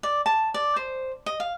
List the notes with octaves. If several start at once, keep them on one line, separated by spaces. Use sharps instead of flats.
D5
A5
D5
C5
D#5
F5